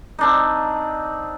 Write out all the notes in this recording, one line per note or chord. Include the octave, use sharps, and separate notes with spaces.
C4 D4 D#4